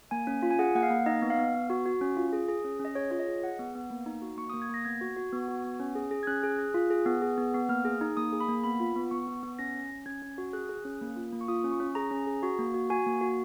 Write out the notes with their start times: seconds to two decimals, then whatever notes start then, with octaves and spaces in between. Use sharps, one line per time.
0.11 A#3 G#5
0.27 C#4
0.43 F4
0.50 G#5
0.59 G#4 F#5
0.75 A#3 F#5
0.83 F5
0.90 A#3
1.06 D#4 D#5
1.22 B3
1.30 F5
1.38 B3
1.54 B3
1.70 F#4
1.86 F#4
2.01 C#4
2.17 F4
2.33 G#4
2.49 G#4
2.64 C#4
2.80 C#4
2.85 D#5
2.95 G#4 C#5
3.11 F4 C#5
3.19 D#5
3.27 G#4
3.43 G#4 F#5
3.59 B3
3.75 B3
3.90 A#3
4.06 D#4
4.22 F#4
4.37 A#3 C#6
4.50 D#6
4.53 A#3
4.62 G#6
4.69 A#3 A#6
4.85 B3 G#6
5.01 F#4
5.16 F#4
5.33 B3
5.48 F#4
5.64 B3
5.80 C#4
5.95 G#4
6.11 G#4
6.23 G#6
6.27 C#4 F#6
6.43 G#4
6.58 G#4
6.74 F4
6.91 G#4
7.06 B3
7.22 G#4
7.38 B3
7.54 B3
7.69 A#3 F6
7.85 G#4
8.01 D#4
8.17 A#3 D#6
8.32 G#4
8.40 B5
8.48 A#3
8.64 B3 B5
8.80 F4
8.96 B3
9.11 B3 C#6
9.27 B3
9.43 B3
9.59 C#4 A#6
9.75 C#4
9.91 C#4
10.06 C#4 G#6
10.22 C#4
10.38 F#4
10.53 G#4 F#6
10.69 G#4
10.85 C#4
11.01 A#3
11.16 F4
11.33 A#3
11.41 C#6
11.48 F4 D#6
11.64 C#4
11.71 C#6
11.80 C#4
11.95 G#4 A#5
12.11 C#4
12.27 G#4
12.43 F#4
12.59 A#3
12.74 F#4
12.90 F#4 G#5
13.06 A#3
13.21 F#4